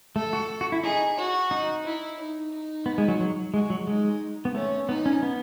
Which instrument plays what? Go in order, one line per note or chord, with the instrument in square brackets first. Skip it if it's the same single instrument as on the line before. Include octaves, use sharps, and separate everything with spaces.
[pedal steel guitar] A3 [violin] A4
[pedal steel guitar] F#4
F#4
E4
[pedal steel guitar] D#4 [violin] G#4
[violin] F#4
[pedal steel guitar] D#4
[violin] E4
D#4
D#4
[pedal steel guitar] B3
G#3
F#3
F#3
[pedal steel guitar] G#3 [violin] F#4
[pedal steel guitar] F#3
[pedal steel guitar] G#3 [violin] D#4
[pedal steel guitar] B3
[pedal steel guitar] A3 [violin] C#4
[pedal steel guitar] B3 [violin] D#4
[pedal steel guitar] C#4
B3